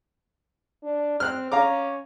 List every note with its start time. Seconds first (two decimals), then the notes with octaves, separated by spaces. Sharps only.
0.83 D4
1.20 C4 F6 F#6
1.52 C#4 F5 A#5 D6